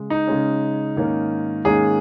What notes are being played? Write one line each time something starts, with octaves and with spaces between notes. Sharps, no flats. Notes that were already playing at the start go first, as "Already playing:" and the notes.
Already playing: C#3 G#3
D#4
C#3 G#3 C#4
G#2 D#3 A#3 C#4
G#2 D#3 A#3 C#4 G#4